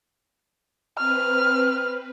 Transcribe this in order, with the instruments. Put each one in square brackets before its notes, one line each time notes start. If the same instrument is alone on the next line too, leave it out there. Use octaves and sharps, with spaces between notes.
[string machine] C4 B4 [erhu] F6